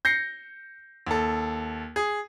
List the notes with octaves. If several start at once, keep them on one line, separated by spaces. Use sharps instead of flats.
G6 A#6 C7 C#7
D#2 A4
G#4